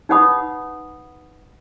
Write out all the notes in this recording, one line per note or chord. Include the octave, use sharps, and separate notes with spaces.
D#4 B4 C#5 F#5 B5 D#6